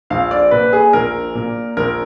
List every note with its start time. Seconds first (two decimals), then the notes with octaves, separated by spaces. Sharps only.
0.10 A#1 F5
0.31 D5
0.51 A#2 B4
0.73 G#4
0.93 A#1 A#4
1.35 A#2
1.77 A#1 A#4